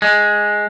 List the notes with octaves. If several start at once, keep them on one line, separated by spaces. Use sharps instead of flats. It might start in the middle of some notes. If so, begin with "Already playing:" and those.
G#3